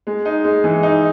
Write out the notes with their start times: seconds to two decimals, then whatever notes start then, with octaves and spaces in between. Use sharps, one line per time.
0.07 G#3
0.25 D#4
0.44 G#3
0.64 E3
0.83 D#4